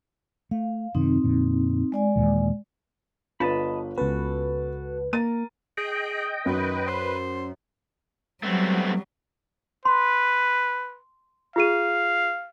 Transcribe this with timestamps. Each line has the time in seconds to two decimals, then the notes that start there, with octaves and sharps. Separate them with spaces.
0.51 A3 F5
0.95 F#2 C3 D#3 C4 D#4
1.24 F2 A#2 D3
1.92 G#3 D5 G#5
2.16 D#2 A#2 E3
3.40 G1 D4 F4 B4 D#5 A5 B5
3.98 C#2 B3 C#4 F#4 A4 B4
5.13 A#3 A#4 A6 D#7
5.77 G#4 D#5 G5
6.46 F#2 D#3 B4
6.87 C5
8.43 F#3 G3 A3 B3 C4
9.85 B4 C6
11.56 F4 G#4 F5 D#7